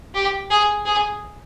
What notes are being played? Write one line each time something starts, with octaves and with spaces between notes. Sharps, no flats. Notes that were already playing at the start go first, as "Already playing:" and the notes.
G4
G#4
G#4